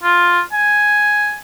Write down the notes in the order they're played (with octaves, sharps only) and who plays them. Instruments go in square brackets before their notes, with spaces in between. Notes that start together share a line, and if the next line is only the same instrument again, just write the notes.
[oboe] F4
G#5